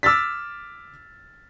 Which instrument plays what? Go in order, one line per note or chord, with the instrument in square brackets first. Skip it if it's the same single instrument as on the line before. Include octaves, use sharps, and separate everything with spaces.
[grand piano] D6 E6 F6 A6 B6